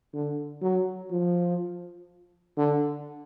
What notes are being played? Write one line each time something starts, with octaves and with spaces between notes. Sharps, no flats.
D3
F#3
F3
D3